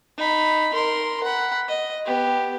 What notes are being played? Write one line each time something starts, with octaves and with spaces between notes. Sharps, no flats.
D#4 B5
A#4 C6
F#5 B5
D#5
B3 G4